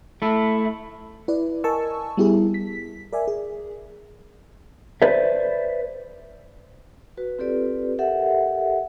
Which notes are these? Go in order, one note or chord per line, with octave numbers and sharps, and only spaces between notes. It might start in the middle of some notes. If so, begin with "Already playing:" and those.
A3 E4
E4 B4 D5
A#4 D#5 G#5 A5 C#6 E6
G3 B3 E4 G4 G#4
B6
A#4 D5 E5 G#5
G#4
B4 C5 D5 E5
F#4 B4
C4 F4 G4 A4 B4 D5
G4 A4 A#4 E5 F#5